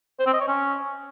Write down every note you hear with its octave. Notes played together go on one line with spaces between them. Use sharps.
C5
C4
D#5
C#5
C#4